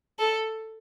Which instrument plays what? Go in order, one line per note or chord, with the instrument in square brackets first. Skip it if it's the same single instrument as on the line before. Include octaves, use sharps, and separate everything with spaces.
[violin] A4